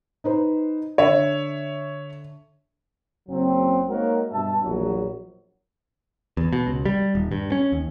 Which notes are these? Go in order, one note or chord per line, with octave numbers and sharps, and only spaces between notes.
D#4 B4 C5
D3 C#5 E5
F#1 F#3 C4
G#3 A#3 D#4 F#4 A#4 C#5
G2 B2 E5 A5
A#1 E2 F#3
E2
B2
C#2
G3
D#1
G2
C#4
D#2